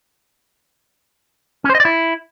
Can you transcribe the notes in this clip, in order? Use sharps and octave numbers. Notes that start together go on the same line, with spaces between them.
C#4
C5
D#5
D5
E4